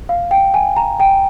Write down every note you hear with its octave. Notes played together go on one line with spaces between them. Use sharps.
F5
G5
G#5
A#5
G5